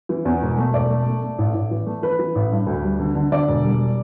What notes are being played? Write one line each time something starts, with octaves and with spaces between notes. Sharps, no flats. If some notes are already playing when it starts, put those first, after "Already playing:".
E3
E2
E1
A3
E1 D5
A3
A3
A3
A1
A1
E3
A3
E3 B4
E3
A1
G2
D2
G3
D3
D3
D3 D5
E1
G3